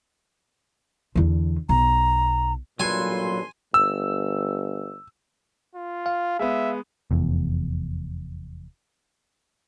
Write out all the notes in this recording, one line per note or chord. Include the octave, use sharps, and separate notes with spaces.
E2 D3
B1 A#5
A1 G2 A#2 F#3 A4 B4 G#5 C6
G1 E6
F4
F5
G#3 B3 E5
F1 E2